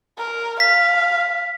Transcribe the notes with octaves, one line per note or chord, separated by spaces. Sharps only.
A#4
F5 B6